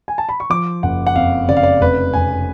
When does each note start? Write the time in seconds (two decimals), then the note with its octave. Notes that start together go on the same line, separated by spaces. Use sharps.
0.08 G#5
0.18 A5
0.29 B5
0.40 C#6
0.50 F3 D6
0.83 F#1 F#5
1.07 F#5
1.16 F2 F5
1.48 C#3 D5
1.57 F5
1.63 D5
1.81 F1 B4
2.13 F1 G#5